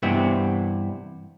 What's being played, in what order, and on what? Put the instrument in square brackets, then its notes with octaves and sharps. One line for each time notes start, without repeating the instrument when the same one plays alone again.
[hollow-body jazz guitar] G2 C3 E3 B3 C4